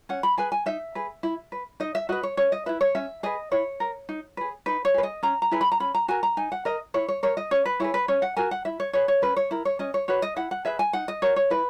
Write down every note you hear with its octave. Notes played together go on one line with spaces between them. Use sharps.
C#4 F#5
B5
G#4 B4 G#5
G#5
D#4 E5
G#4 B4
E4
B4
D#4 D#5
E5
F#4 B4 D#5
C#5
C#4 C#5
D#5
E4 B4 E5
C#5
C#4 E5
G#4 B4 D#5
E4 C#5
A#4
D#4
G#4 B4
D#4 B4
C#5
G#4 B4
D#5
C#4 A#5
A#5
E4 G#4 B4
B5
A#5
C#4 B5
A#5
F#4 A#4 G#5
A#5
D#4 G#5
F#5
A#4 D#5
E4 C#5
C#5
A#4 C#5
D#5
C#4 C#5
B4
E4 G#4 B4 C#5
B4
C#4 C#5
F#5
F#4 A#4 G#5
F#5
E4 E5
C#5
G#4 B4 C#5
C#5
C#4 B4
C#5
E4 A#4
C#5
C#4 D#5
C#5
F#4 B4 C#5
D#5
E4 F#5
F#5
G#4 B4 E5
G#5
D#4 F#5
D#5
F#4 A#4 C#5
C#5
E4 B4